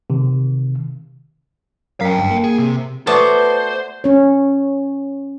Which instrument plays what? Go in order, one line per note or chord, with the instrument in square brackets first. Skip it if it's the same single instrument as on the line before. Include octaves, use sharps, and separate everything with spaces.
[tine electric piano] C3 D#3
[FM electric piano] F#2 A#4 B6 [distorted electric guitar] F5 G5
[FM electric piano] G1 G2
A#3
[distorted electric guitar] G#4
C3
[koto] A3 B3 [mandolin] F#4 D5 A5 [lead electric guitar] C5
[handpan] C#4 C#5